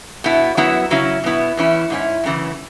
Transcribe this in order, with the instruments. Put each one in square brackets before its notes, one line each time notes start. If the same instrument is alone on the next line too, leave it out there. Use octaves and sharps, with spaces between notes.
[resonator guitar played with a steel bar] B2 B3 E4
F#2 F#3 B3 E4
C#3 F#3 C#4 E4
B2 B3 E4
E2 E3 C#4 E4
G#2 F#3 C#4 E4
F#2 C#3 E3